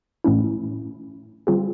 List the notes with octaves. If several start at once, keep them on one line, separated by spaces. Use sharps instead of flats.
A2 E3 A3 C#4 E4
D3 G3 C4 F4 G#4